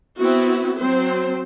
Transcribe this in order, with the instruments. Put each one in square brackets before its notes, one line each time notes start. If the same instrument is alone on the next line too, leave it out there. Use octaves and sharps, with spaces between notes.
[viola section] B3 C4 E4 F#4
F#3 C4 C5